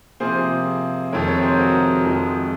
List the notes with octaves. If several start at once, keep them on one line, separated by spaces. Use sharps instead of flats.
C3 F3 A#3 G#4 C5
F2 C3 D#3 G#3 A#4 C#5
A#4 C#5
G#4 C5
F#4 A#4
F2 D#3 G#3